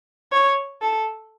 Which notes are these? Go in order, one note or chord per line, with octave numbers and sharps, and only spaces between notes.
C#5
A4